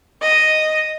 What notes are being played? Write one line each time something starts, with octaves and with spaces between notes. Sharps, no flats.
D#5